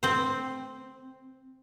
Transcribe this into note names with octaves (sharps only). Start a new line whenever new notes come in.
C4 C5